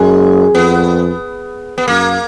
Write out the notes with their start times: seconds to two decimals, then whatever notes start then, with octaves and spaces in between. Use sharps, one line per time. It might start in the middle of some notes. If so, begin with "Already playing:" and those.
Already playing: F#2 G#3
0.54 F2 B3
1.78 B3
1.88 F#2 A#3